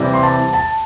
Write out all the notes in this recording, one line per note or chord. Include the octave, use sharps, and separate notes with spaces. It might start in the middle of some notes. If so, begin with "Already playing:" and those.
Already playing: C3 E3 G3
C6
A5
A5